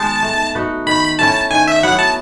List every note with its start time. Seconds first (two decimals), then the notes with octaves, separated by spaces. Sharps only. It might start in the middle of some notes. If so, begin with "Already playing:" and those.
Already playing: D#3 G#3 B3 D#4 A5
0.22 A3
0.55 D#4 F#4 B4
0.86 D#3 B5
1.19 A3 C#4 E4 A5
1.51 D#3 G#5
1.67 E5
1.83 F#3 B3 E4 F#5
1.99 A5